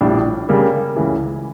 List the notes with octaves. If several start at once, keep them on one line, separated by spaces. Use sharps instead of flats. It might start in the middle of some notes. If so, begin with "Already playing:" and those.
A#1 A2 G3 D4
C#3 G3 A#3
C#2 C#3 E3